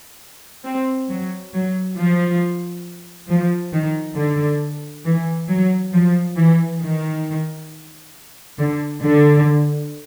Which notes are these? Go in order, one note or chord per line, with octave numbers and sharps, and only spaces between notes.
C4
F#3
F#3
F3
F3
D#3
D3
E3
F#3
F3
E3
D#3
D3
D3